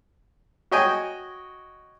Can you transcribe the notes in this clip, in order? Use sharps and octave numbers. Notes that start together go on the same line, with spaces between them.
F#4 C#5 D#5 G5 G#5